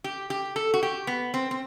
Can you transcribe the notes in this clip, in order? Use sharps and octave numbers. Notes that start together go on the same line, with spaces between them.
G4
G4
A4
F#4
G4
B3
C4
C4